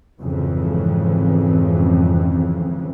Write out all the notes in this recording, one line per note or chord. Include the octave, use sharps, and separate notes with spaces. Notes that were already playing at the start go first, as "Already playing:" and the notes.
G#1 F2 C#3 E3